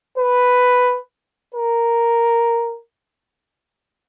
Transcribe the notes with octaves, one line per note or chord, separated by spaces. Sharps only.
B4
A#4